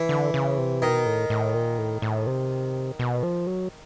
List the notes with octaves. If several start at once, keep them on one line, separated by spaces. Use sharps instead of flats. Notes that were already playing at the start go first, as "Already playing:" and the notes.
Already playing: E3
D3
C#3
C3
B2 D#3
A2
A2
A#2
A2
A2
C3
B2
F3
F#3